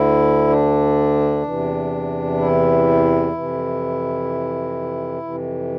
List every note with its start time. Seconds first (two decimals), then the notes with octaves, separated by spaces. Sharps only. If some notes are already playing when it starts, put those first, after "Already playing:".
Already playing: D2 D3 E4
0.48 D4
1.43 E2 C3 E3
2.37 E4
3.32 F2 C3 E3
5.22 F2 C3 E3